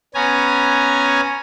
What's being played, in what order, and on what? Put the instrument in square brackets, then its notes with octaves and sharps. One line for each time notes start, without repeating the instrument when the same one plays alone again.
[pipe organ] B3 C#4 G#5 A#5